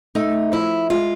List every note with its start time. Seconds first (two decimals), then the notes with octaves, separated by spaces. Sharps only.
0.15 A3 D#4
0.52 F3 E4
0.90 G#3 F4